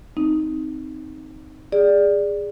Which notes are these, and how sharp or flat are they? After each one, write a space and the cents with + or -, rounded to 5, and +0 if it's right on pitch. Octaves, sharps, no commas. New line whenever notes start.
C4 +0 D#4 +0
G#4 -20 D5 +0